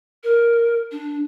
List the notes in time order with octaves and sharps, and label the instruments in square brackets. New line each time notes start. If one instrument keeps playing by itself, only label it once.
[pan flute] A#4
D4